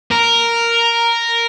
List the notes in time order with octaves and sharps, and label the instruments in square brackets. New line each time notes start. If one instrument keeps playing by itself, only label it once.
[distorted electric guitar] A#4